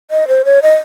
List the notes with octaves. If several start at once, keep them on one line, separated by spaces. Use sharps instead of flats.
D#5
C5
C#5
D#5